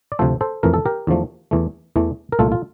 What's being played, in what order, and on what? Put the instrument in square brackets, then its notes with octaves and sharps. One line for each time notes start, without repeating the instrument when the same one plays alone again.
[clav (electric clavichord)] D5
D2 C3 F3 A3 A4 C5
A4 C5
F2 E3 A3 A#4
A4
G4 A#4
E2 D3 F3 A3
E2 E3 A3
E2 E3 A3
A#4
C2 A#2 A3 F4 A4
F4